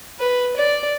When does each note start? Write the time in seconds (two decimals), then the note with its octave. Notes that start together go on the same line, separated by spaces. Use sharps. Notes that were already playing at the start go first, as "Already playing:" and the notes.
0.19 B4
0.57 D5